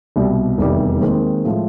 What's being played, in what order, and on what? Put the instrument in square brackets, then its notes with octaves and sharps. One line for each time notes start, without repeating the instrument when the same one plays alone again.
[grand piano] C2 B2 G3
F1 E2 C3 D#3 G3
D#2 D#3 G#3 C4
A2 F3 G#3